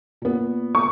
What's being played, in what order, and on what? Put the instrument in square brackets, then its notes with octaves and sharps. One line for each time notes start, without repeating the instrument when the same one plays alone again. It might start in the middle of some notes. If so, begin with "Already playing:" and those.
[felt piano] A#2 B3
[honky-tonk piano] C#6